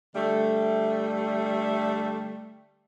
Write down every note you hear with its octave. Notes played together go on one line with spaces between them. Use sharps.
D3 G3 A3